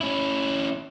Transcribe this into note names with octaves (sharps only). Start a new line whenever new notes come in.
C#4 E4